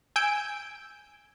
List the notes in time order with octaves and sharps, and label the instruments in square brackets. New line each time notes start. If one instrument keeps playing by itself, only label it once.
[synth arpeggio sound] G#5 E6 G6 D7